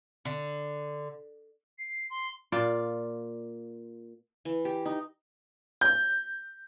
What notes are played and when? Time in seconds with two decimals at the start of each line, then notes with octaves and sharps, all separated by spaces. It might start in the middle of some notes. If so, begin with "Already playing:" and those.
0.25 D3
1.78 C7
2.10 C6
2.52 A#2 F4 D5
4.45 E3
4.65 G4
4.85 D#4
5.81 G6